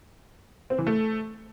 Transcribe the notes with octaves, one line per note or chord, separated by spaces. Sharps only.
C4
E3
A3